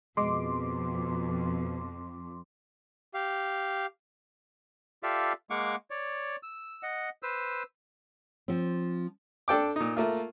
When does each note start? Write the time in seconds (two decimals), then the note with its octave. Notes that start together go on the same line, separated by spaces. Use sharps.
0.17 F2 B2 G#3 C6 D6
3.14 G4 F5
5.03 F4 G4 A4 D5 E5 F5
5.50 G#3 A#3 F5 F#5 C#6 D6
5.90 C#5 D5
6.43 E6
6.83 D#5 F#5
7.23 B4 C5 E6
8.48 F3 C4
9.48 D4 A4 G5 D6
9.76 A#2 D#4
9.97 A3 A#3 F4